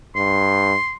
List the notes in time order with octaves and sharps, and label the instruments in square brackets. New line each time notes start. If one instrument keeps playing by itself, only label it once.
[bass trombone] G2 [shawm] C6